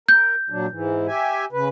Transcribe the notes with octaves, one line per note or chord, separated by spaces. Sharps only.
A#4 G6
A#2 F#3 D4
G#2 E3
G4 E5 G#5
C#3 B4